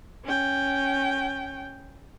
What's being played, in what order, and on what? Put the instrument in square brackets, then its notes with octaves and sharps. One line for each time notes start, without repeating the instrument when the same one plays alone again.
[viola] C#4 G5